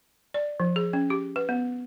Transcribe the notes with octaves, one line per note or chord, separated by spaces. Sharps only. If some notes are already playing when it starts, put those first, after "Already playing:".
D5
F3
G#4
C#4
G4
B4
B3